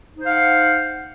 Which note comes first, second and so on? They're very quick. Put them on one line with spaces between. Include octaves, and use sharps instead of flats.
D#4 C5 F5 F#5